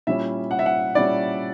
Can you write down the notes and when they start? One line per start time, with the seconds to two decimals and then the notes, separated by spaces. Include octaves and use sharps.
0.07 A#2 G3 C#4 E4 E5
0.51 F#5
0.59 E5
0.66 F#5
0.95 A#2 G3 C#4 E4 D5